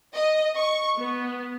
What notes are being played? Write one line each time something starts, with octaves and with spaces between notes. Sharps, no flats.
D#5
C#6
B3